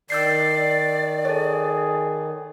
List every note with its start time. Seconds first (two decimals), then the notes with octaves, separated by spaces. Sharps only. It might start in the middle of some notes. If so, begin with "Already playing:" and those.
0.10 D#3 D5 E6 G6 C7
1.25 G#4 A4 C#5